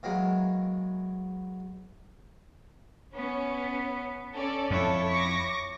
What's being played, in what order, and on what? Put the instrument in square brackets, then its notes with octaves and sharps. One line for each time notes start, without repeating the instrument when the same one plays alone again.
[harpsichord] D#3 E3 F#3 G#3 A#3
[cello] B3 [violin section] C#4
[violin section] C#4 A4 D5
[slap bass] F2 [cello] E4 C#5 [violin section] A4
[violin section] C#6 D6 A#6